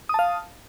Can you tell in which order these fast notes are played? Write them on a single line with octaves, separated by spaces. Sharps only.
D#6 A5 F5